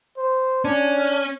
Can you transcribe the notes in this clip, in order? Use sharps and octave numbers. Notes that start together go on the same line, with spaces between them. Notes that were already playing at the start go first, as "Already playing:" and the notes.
C5
C#4 D4